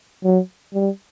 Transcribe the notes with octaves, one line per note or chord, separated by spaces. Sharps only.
F#3
G3